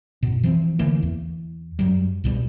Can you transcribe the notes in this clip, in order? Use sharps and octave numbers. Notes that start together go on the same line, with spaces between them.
F#2 B2
E3 F3 B3 C4
D3 E3 A3 A#3
E2
F#2 F#3 G3
C2 B2 G3